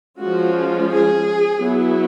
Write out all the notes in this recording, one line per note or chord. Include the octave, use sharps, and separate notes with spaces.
F3 G#3 C#4 F4 F#4
G#4
F#3 B3 E4